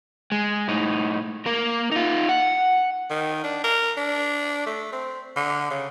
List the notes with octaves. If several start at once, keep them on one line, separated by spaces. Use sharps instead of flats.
G#3
A2 D#4
A#3 A#4
D#4 F4
F#5
D#3
D4
A#4
D4
A3
C4
D3
C#3